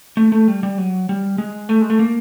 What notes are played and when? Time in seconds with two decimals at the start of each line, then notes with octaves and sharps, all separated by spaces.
0.17 A3
0.32 A3
0.48 G3
0.63 G3
0.78 F#3
1.09 G3
1.38 G#3
1.69 A3
1.82 G#3
1.90 A3
1.99 A#3